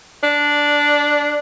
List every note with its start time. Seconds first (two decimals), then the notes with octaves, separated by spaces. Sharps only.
0.24 D4